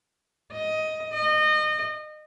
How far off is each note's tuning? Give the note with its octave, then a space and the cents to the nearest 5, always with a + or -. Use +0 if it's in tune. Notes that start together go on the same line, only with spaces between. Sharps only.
D#5 +10
D#5 -30